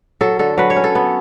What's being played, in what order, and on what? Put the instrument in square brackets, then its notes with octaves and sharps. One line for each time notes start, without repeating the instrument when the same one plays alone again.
[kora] F#3 A4
D3 A4
F#3 B4
C#5
C#4
A4
B3